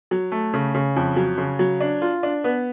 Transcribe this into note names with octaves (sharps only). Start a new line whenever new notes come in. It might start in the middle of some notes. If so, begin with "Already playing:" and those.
F#3
A3
C#3
C#3
F2
F#3
C#3
F#3
D4
F4
D4
B3